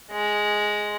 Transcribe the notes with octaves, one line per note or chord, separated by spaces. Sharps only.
G#3